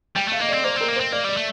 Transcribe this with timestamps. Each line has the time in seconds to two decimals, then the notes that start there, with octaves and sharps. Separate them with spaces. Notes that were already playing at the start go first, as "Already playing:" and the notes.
0.16 G3 G5
0.28 A3 F5
0.40 A#3 D#5
0.49 D5
0.53 C4
0.59 D5
0.64 A#3 C5
0.76 C4 A#4
0.88 A#3
0.96 C5
1.00 C4
1.12 A#3 D5
1.24 G3 D5
1.37 A3